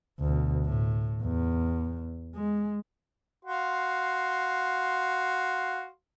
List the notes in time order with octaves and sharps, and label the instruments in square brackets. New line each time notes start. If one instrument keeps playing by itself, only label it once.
[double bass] D2 B2
A2
E2
G#3
[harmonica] F#4 F5 C6